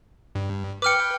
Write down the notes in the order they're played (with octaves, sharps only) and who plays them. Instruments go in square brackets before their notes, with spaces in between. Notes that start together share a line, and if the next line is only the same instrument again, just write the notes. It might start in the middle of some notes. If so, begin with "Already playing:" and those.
[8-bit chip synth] G2
[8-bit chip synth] B4 G5 [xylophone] D6 F6 C#7